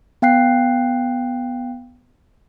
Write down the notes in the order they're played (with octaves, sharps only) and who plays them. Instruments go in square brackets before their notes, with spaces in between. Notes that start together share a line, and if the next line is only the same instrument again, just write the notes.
[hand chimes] B3 F5 G5 F#6 C7